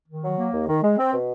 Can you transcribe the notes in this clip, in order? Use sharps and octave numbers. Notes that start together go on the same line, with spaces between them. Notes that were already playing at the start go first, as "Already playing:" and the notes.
D#3
F#3
A#3
D#2
D#3
G#3
C4
B2